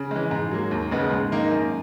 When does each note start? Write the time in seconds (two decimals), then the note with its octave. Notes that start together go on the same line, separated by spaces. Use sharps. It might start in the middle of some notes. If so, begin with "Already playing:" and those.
Already playing: C#3
0.11 E3 G#3
0.31 G#2
0.52 F#3 A#3
0.71 D#2
0.91 C#3 G#3 B3
1.11 G#2
1.32 D#3 A#3 D#4
1.51 F#2